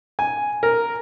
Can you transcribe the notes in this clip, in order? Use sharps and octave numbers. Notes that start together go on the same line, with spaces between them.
G#5
A#4